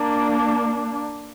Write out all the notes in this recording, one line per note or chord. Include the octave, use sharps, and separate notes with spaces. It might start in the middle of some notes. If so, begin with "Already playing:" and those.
Already playing: A#3 D4